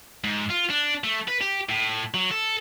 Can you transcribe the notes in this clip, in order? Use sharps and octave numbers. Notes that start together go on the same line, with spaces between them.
G#2
F4
D4
A3
B4
G4
A2
F#3
A4